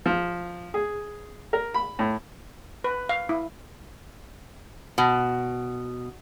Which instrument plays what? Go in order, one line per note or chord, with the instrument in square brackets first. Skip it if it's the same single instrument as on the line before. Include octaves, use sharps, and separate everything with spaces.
[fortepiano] F3
G#4
A#4
B5
A2
[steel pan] B4
F5
E4
[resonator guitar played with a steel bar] B2